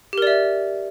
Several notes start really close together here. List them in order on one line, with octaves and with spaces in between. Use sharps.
G4 A#4 D5 E5